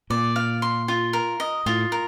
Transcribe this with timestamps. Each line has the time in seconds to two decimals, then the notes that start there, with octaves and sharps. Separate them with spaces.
0.10 A#2 D5
0.36 F5
0.62 C6
0.88 F4
1.13 A#4
1.40 D#5
1.66 A2 F4
1.92 A#4